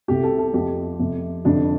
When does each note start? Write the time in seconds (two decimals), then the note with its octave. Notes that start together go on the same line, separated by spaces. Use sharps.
0.08 C2 C3 A3 G4
0.23 A4
0.38 A4
0.53 F2 F3 A3 G4
0.99 F2 C3 A3
1.45 F1 F2 D3 A3 D4